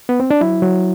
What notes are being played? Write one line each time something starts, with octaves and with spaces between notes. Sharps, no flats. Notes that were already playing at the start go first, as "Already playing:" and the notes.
B3
C4
D4
F#3 E4
F#3